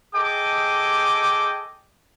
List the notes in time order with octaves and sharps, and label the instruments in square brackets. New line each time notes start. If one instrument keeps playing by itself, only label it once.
[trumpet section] G#4 A4 D#5 G5 D6